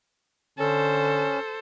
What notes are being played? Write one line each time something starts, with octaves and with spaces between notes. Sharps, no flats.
D3 C#4 A4 C5